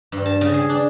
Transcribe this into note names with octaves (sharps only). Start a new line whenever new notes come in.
G2
A5
C#3
G#4
D4